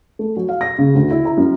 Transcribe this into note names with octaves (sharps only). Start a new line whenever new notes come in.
A3
F#3
F5
A#6
C#3
D2
E4
A#5
F#2